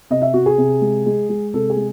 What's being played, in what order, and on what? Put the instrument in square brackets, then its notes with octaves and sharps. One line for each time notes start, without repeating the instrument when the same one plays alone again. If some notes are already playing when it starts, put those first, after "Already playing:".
[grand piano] C3 D#5
E5
C3 F#4
G#4
C3
G#3
G#3
G#3
C3 A4
G#4
G#3